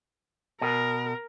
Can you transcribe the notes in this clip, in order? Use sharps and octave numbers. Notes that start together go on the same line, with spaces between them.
B2 A#4